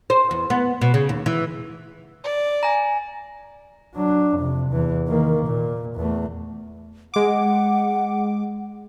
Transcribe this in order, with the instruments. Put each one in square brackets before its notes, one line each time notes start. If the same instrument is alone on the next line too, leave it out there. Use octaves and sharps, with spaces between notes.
[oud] C5
E2
B3
B2
C#3
D#2
E3
[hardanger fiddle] D5
[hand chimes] G#5 A#5
[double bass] F#3 D4
F2 C3
E2 E3
D#3 A#3
A#2
E2 A3
[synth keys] G#3 D6 [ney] F#5